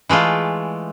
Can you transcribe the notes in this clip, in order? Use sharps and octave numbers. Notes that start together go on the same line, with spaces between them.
E3 G#3 A3 F4